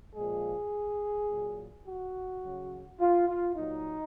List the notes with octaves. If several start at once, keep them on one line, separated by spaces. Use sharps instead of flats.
A#2 F3 G#3 G#4
A#2 F#3
F#4
C#3 F#3
F4
F4
A#2 F#3 D#4